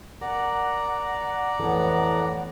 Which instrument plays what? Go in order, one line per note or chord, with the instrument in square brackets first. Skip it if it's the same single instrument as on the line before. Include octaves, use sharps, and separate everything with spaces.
[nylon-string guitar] A#4 [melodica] D5 A#5 [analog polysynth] F#5
[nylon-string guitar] F2 E3 A4 [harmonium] A2 B3